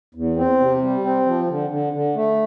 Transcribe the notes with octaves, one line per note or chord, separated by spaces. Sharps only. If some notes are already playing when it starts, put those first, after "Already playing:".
E2
C4
C3
G3
C4
F3
D3
D3
D3
A3